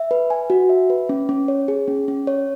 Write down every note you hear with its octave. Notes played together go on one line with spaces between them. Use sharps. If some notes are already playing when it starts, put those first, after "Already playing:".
Already playing: E5
B4
G#5
F#4
E5
B4
C#4
C#4
C#5
G#4
C#4
C#4
C#5